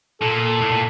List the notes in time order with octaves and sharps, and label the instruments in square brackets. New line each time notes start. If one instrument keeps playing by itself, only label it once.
[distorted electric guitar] A#2 [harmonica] A4
[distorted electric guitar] A2
A#2